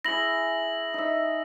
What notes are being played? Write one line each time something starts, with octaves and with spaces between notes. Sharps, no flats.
E4 G#4 A#6 F#7
D#4 D#5 E5